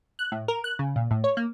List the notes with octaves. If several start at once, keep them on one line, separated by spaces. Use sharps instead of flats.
F#6
A2
A#4
F#6
C#3
A#2
A2
C#5
A#3